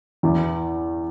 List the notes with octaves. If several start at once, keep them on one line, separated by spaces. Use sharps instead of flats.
E2 E3